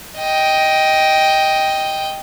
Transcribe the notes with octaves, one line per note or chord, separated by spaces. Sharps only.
D#5 G5